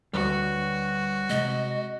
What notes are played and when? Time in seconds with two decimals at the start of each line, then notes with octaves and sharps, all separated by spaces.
0.13 D2 G3 F#4 B4 C#5
1.30 C3 G#3 D#5